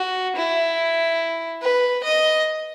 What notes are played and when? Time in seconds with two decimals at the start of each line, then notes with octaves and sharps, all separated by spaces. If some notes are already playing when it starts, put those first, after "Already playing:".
Already playing: F#4
0.36 E4
1.62 B4
2.04 D#5